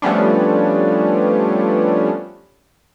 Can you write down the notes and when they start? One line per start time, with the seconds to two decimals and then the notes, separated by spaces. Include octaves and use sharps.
0.02 F3 G3 A3 B3 C#4 D4